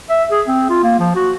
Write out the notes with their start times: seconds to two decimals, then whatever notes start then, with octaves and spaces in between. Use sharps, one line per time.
0.10 E5
0.31 G#4
0.48 C4
0.70 F4
0.84 A#3
1.00 F3
1.15 F#4